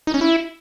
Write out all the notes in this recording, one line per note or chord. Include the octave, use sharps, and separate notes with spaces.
D#4
C#4
E4